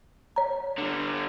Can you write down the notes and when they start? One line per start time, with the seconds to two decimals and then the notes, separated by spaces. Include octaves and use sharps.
0.36 C#5 A#5
0.78 D3 G3